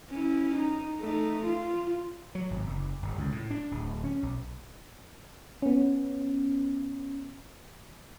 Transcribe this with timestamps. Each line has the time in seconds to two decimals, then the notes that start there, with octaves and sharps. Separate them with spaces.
0.11 C#4 E4
0.55 D#4
1.01 A3 D#4
1.45 F4
2.35 F#3
2.51 G#1
2.67 F#1
3.02 G1
3.18 C#2
3.32 A2
3.51 D4
3.71 D1
4.04 C#4
4.23 B1
5.62 B3 C#4